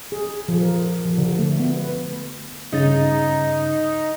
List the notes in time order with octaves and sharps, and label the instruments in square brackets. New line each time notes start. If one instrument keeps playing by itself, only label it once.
[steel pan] G#4
F3
A#4
F3
D3
A3
B3
B4
[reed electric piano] G2 C#3 A6 [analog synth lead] D#4